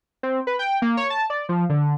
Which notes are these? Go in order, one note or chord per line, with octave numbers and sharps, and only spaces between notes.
C4
B4
G5
A#3
C#5
A5
D5
F3
D3